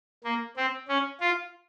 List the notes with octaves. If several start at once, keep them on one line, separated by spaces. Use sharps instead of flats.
A#3
C4
C#4
F4